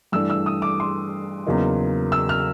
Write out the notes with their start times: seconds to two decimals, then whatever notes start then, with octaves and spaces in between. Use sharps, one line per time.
0.12 G2 E3 A3 D4 E6
0.30 E6
0.46 D#6
0.62 D6
0.80 C6
1.46 E2 C#3 F#3 A#3 D#4
2.12 E6
2.29 F6